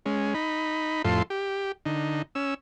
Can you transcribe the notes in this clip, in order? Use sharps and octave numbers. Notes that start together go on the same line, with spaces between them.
G#3 C#4
D#4 B5
F2 A2 F4 A4 C6
G4
D3 D#4
C#4 E6